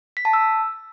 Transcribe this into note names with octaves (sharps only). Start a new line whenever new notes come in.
B6
A5
E6